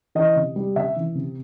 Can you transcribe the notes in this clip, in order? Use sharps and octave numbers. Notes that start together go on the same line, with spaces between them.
E3 D#5
C3
G3
C3 E5
E3
C3